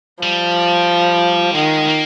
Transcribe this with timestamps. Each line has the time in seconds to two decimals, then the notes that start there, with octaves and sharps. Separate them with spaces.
0.23 F3 G3
1.55 D#3 G#3
1.88 A#3